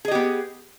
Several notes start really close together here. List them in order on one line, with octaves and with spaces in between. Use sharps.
G#4 D#5 G4 B3